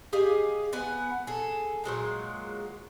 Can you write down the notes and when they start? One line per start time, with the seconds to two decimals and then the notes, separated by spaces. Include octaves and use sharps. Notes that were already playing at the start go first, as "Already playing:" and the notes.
0.13 G4 G#4 D#5 F5
0.73 B3 F#5 G#5
1.27 G#4 A4
1.84 A#2 F#3 G#3 A#3